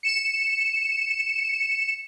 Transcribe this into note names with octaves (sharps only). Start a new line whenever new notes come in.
C#7 E7